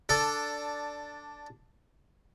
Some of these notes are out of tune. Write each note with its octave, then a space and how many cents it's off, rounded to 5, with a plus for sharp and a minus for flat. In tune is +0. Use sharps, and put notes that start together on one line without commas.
D4 +0 A4 +10